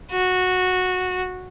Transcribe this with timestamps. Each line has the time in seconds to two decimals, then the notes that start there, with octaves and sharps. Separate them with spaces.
0.11 F#4